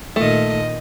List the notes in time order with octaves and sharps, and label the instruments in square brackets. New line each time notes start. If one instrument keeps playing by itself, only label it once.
[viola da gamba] A#2 D#3 D#5 [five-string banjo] A3